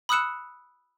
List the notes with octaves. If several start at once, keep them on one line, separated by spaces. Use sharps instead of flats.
B5 D#6 E6 F#6 C#7 E7